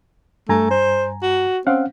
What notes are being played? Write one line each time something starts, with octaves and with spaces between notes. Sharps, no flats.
G2 A3 G#5 A#5
C5
F#4
C4 C#4 F5 F#5